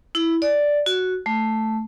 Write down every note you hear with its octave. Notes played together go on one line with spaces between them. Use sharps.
E4
D5
F#4
A3